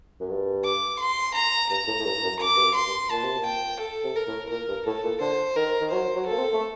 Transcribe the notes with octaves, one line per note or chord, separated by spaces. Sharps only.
F#2
G2
D6
C6
A#5
G2 A#5
A2
A2
G2
F#2
F#2 D6
G2
F#2
C6
G2
A#2 A5
C3
A#2
G5
A4
C3
A#4
A2
A#2 A#4
G2
A2 A4
A#2
D3 C5
D#3 A#4
D#3
F#3 C5
F#3
A#3 A4
C4
A3